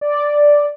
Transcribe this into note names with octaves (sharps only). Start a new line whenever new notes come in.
D5